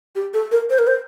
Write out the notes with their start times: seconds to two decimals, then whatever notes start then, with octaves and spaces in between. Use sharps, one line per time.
0.15 G4
0.34 A4
0.51 A#4
0.70 C5
0.78 A#4
0.87 C5